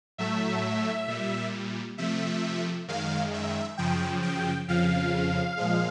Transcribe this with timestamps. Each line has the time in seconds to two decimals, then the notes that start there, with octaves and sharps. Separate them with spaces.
0.18 A2 F#3 A3 E5
1.08 A#2 G3
1.98 C3 F3 A3 E5
2.88 F#2 D#3 G#3 F5
3.33 E5
3.78 F#2 C#3 F3 G5
4.22 G5
4.68 F2 C#3 F3 F5
5.57 A#2 F3 G#3